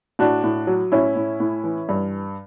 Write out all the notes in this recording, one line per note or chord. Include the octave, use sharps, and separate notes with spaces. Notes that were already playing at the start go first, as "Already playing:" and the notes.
A2 D4 F#4
A2
F#3
A2 C#4 E4
A2
A2
E3
G2